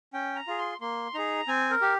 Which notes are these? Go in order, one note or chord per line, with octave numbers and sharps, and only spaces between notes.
C#4 G5
A#5
F4 G#4
C6
A#3 C6
D#4 G#4 A#5
C4 G#5
A#4
G4